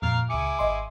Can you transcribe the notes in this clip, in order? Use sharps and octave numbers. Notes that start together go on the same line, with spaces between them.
F2 A#2 A#4 F5 F6
C#2 E4 G#4 D6 C#7
G#1 D#5 C6